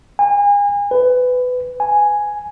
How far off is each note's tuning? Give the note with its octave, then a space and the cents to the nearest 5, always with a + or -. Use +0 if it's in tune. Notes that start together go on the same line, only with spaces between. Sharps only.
G#5 -35
B4 +20
G#5 +0